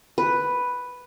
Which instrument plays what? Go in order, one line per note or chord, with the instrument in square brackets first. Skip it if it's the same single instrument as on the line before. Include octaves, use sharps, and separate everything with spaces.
[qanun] B4